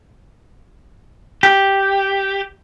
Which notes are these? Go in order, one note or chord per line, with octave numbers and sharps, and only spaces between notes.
G4